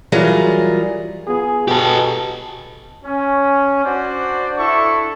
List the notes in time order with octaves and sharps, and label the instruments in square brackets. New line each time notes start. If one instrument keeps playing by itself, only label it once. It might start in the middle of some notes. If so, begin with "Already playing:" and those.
[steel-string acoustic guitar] E3 F#3 G3 F4 G#4 A#4
[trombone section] B3 F4 G#4
[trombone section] B2 [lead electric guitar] G4 A4
[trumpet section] C#4
D4 F#4 C5 D5
D4 E4 A4 E5 C#6